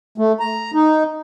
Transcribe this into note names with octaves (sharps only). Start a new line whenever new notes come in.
A3
A#5
D#4